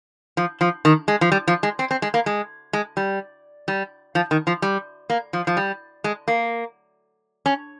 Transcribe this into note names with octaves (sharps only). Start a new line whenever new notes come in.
F3
F3
D#3
G#3
F3
G3
F3
G#3
C4
C4
G#3
A#3
G#3
G#3
G3
G3
F3
D#3
F3
G3
A#3
F3
F3
G3
G#3
A#3
C#4